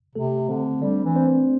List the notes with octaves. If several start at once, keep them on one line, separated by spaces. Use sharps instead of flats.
C3 A3 A4
D3 C4 C5
G3 D4 D5
E3
C4 C5